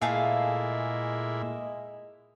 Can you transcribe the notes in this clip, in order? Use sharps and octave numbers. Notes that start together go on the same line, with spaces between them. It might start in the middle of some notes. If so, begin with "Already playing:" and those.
A#2 G#3 A3 E4 G#4 F5